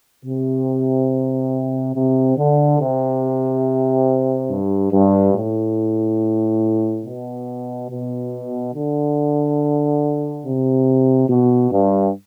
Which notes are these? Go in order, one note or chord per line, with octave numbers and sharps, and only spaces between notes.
C3
C3
D3
C3
G2
G2
A2
B2
B2
D3
C3
B2
G2